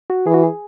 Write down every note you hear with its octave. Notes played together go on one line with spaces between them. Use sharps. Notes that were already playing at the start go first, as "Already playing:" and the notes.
F#4
E3 G#4
F#4
G#4